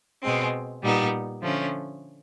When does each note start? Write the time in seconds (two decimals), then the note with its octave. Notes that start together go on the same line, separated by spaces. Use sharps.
0.22 B2 G#3 C4
0.82 A#2 G3 B3 D#4
1.42 D3 F3 A3 C#4